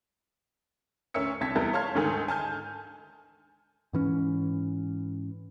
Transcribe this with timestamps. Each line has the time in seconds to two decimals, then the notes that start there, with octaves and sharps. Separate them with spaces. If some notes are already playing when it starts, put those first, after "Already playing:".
1.14 D2 C#4 A#4 E5 E6 C#7
1.41 C2 D4 A5 G#6 B6
1.56 E2 G3 E4 A4 A#4
1.73 C#5 F5 A5 C6 F6 G#6
1.95 D2 G#2 D3 D#3 A4 G#5
2.28 G#5 A5 F6 G6
3.93 G#2 E3 C#4